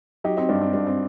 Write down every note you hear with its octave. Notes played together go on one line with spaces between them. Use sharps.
F#3 D#4 G4
C4 D#4
G2 D4
C4
G2 D4
C4